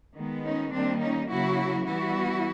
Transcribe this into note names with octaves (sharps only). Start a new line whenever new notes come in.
D#3 G#3 B3
C#4 D#4
D#3 G3 A#3 C4 D4
C#4 D#4
C#3 F#3 A#3 E4 F#4
E3 G3 B3 E4 F#4